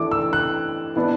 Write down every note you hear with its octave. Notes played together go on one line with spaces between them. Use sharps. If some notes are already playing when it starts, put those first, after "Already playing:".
Already playing: E3 A3 D4 D6
E6
F#6
E3 B3 D4